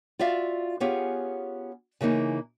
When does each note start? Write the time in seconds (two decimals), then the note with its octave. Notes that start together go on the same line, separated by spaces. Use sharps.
0.19 F4 F#4 D5 E5 F5
0.80 B3 C#4 F4 G4 G#4 C#5
2.01 C#3 E3 A#3 D#4